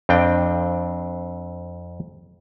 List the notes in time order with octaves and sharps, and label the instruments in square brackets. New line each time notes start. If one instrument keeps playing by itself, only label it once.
[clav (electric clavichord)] F2 C4 D4 G5